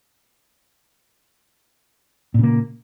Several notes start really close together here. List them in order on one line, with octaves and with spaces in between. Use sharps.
A#2 C#3 A#3